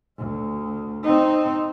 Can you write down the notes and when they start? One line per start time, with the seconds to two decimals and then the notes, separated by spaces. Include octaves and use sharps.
0.18 D2
1.04 C4 D#4